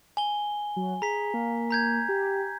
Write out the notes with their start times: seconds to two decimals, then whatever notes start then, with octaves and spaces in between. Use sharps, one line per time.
0.17 G#5 G7
0.76 F#3
1.02 G#4 A#5 B6
1.34 A#3
1.71 A#5 G6 G#6
2.09 G4